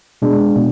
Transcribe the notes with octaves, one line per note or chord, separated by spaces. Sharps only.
B2 G#3 D4
B2